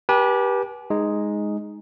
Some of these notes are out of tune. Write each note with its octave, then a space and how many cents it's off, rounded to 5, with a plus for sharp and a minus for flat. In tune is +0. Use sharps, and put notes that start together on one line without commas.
G4 +0 B4 -35 G#5 +45
G#3 +0 D#4 +0